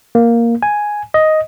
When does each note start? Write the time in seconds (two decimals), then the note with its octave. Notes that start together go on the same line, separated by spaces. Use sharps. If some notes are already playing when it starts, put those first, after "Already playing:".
0.15 A#3
0.63 G#5
1.14 D#5